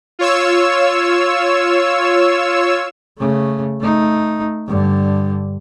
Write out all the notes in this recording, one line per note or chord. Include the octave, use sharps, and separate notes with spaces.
F4 C#5 E6
C#3 A3
A3 D#4
G2 D3